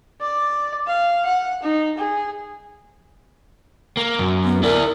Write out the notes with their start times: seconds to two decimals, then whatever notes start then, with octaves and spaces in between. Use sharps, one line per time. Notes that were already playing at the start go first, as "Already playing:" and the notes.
0.21 D5
0.87 F5
1.25 F#5
1.63 D#4
1.98 G#4
3.97 A#3
4.19 F#2
4.45 B3
4.63 E4 A#4 D5